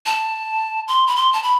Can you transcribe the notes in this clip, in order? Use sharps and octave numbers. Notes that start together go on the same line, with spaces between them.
A5
C6
B5
C6
A5
B5